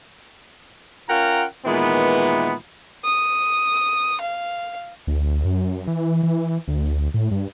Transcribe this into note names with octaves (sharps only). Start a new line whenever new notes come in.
C#4 F4 A#4 F#5 G5 A#5
A#2 D#3 E3 G#3 B3
D#6
F5
D2
F#2
E3
E3
D2
A2
G2